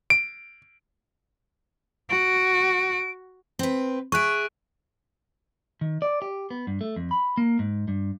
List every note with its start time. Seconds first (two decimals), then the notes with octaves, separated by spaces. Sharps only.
0.10 D7
2.10 F#4 D7
3.59 C4 B4
4.12 G#4 E5 C#6 F#6 D7
5.81 D#3
6.02 D5
6.22 G4
6.51 B3
6.67 G2
6.81 A3
6.96 F2
7.11 B5
7.37 A#3
7.59 G#2
7.88 G2